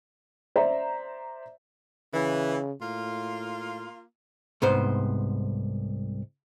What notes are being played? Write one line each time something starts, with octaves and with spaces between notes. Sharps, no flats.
C5 D5 E5 A#5
C#3 E3
A2 A#3 F4
C2 G#2 B3 C5